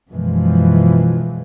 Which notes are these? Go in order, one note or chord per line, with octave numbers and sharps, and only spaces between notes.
F#2 B2 E3 F3 G#3